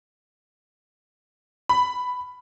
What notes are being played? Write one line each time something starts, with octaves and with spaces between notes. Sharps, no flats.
B5